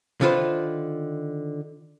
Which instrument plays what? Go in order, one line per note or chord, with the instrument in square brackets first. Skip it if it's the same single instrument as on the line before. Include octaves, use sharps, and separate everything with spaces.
[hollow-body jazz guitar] D3 D#3 F4 B4 C5